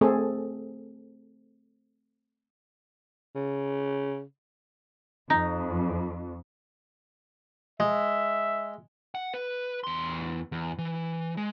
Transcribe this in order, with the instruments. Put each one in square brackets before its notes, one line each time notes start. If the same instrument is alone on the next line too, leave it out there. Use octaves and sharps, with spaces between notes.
[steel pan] A3 C4 G#4 A4
[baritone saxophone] C#3
[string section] F2 [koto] D#4
[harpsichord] G#3 [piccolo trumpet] E5
[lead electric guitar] F#5
B4
E2 C6
E2
E3
G#3